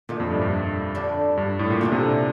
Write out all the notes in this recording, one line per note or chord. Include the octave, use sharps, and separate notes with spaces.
A#2 D3 A3 D#4
F2
G2
G2
D3 G3 D4
G2
A2
A#2
A#2 D3 A3 D4
C3